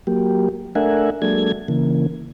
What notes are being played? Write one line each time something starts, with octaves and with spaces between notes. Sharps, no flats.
F#3 A#3 G4
A3 D4 A#4 E5 F#5 G#5
F#3 G#3 A#3 D4 A4 G#6
C#3 E3 A#3